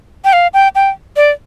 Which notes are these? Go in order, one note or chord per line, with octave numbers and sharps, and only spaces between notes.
G5
F5
G5
G5
D5